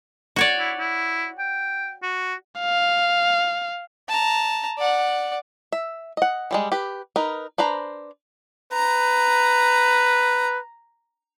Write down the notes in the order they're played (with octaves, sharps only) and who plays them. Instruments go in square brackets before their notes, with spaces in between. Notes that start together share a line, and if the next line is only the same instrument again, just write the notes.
[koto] F#4 C#5 D5
[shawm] E4
E4
G5
F#4
[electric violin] F5
[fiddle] A5 A#5
D5 F#5
[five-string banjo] E5
D#5 F#5
E3 G3 G#3
G4 B4
D#4 A#4 B4
D4 B4 C5 A#5
[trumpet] B4 [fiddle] A#5